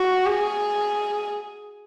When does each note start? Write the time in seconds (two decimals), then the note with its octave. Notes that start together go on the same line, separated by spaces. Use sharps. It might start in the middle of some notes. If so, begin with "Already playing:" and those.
Already playing: F#4
0.26 G#4